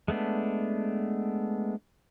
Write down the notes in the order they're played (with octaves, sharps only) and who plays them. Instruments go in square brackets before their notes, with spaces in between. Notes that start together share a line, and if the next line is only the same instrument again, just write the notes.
[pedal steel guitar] G#3 A3 B3 D4